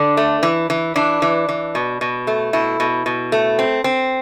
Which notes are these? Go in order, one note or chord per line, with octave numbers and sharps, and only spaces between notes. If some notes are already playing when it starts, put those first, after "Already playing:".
Already playing: D3 D4
A3
E3
E3
E3 D4
E3
E3
B2
B2
A3
B2 E4
B2
B2
A3
C4
C4